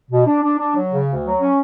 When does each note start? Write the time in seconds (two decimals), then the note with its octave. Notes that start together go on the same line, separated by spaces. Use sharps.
0.11 B2
0.26 D4
0.43 D4
0.59 D4
0.75 F#3
0.91 C#3
1.07 D2
1.24 F#3
1.39 C#4